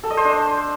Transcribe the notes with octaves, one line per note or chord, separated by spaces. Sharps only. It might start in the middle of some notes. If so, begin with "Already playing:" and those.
A4
D#5
C5
D4